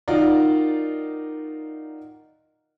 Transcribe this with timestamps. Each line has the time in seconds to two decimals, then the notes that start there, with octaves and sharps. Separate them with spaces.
0.08 D#3 D#4 F4 F#4 A#4 D5